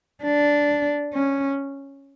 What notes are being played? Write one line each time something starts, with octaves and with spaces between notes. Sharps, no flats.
D4
C#4